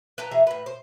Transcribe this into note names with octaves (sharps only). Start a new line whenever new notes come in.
B4 G5 A5 A#5
E3 G#4 E5 A#5
A2 B4
C5